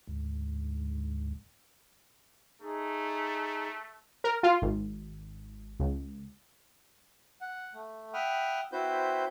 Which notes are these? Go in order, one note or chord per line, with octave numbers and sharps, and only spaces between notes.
D2 G#2
A3 D#4 G#4
A#4
F4
G#1
C#2
F#5
A3
E5 F#5 G5 B5 D#6 F6
C4 E4 F#4 B4 C5 G6